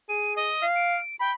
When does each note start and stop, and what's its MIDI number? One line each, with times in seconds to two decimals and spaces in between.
0.09 0.51 68
0.09 0.33 99
0.36 0.65 75
0.62 0.98 77
0.76 1.16 98
1.20 1.31 79
1.20 1.34 83